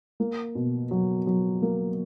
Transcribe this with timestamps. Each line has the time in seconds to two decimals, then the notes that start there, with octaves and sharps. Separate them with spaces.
0.20 A#3
0.55 B2
0.91 F#3
1.27 F#3
1.62 A#3